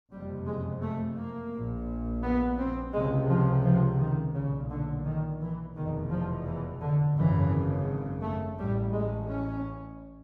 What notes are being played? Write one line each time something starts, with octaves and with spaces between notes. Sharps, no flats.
F#1 F2 C3 G3
G#3
A3
A#3
A#1 A#2
B3
C4
C#2 C3 G#3
F3
F3
D#3
B1 A#2 C#3
D3
D#3
E3
F1 E2 B2 D#3
F3
E3
D3
G#1 F#2 C#3 E3
A3
A1 A2 G3
G#3
C#4